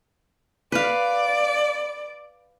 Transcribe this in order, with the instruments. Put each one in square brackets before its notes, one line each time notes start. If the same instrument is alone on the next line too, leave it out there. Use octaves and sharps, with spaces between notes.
[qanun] B4 F5 [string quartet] D5